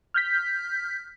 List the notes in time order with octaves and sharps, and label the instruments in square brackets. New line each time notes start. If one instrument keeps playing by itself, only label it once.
[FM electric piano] F6 G6 B6